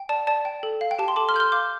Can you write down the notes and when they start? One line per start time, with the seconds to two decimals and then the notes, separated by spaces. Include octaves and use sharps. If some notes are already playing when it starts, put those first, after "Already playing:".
Already playing: G5
0.09 D5 A5
0.27 D5 A5
0.45 G5
0.63 A4
0.81 F5
0.91 G5
0.99 G4 A5
1.08 C6
1.16 A4 A5 D6
1.29 C6 F6
1.34 A4 G6
1.40 C6 F6
1.52 F5 D6 G6